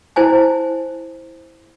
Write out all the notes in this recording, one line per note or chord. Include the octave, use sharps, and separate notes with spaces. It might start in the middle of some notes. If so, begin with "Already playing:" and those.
E4 C5 G#5 A5